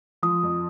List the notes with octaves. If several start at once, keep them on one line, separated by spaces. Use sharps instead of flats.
F3 D#6
F2